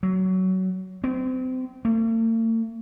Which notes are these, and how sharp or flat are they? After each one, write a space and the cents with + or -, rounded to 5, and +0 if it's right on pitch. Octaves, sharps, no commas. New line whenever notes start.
F#3 +20
C4 -30
A3 +45